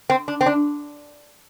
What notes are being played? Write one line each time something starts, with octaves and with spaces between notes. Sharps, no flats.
C4
D4
C4
D4